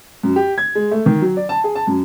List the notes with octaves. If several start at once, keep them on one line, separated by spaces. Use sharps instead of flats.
F#2
G4
G#6
G#3
A3
D#3
F#3
D5
A5
G#4
A5
F#2